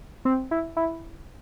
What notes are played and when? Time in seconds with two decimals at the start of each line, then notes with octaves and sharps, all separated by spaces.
0.25 C4
0.51 E4
0.77 E4